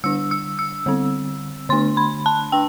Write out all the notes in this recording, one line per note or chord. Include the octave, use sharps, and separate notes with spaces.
D3 G3 D4 E6
E6
E6
D3 G3 C4
D3 A3 D4 C6
B5
A5
D4 G5